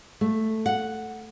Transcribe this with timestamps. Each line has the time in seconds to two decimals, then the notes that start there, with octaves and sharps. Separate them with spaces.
0.21 A3
0.66 F#5